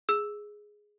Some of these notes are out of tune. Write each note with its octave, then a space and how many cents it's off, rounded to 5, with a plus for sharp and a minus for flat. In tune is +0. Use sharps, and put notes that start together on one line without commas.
G#4 +5 E6 +0